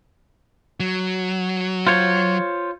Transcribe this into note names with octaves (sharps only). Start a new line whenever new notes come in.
F#3
F4 C5 C#5